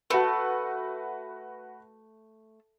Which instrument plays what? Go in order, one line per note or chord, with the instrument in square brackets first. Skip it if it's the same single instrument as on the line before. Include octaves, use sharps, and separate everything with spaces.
[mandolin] A3 [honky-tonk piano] F#4 B4